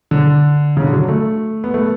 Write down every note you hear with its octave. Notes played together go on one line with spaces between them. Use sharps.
D3
C#3
D3
F#3
A3
B3
A3